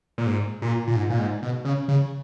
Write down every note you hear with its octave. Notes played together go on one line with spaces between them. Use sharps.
A#2
G#2
A#2
A#2
G#2
A#2
G#2
B2
C#3
C#3